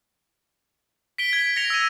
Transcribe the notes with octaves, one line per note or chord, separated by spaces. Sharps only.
B6 D7 G7
G#6
A#6 C#7 F7
E6 D#7